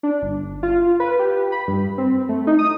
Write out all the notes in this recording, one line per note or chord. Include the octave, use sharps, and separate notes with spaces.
D4
G1
F4
B4
G4
B5
G2
C4
A3
D#4
D#6